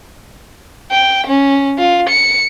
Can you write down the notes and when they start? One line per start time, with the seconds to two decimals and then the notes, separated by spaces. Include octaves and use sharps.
0.91 G5
1.27 C#4
1.78 F4
2.09 C#7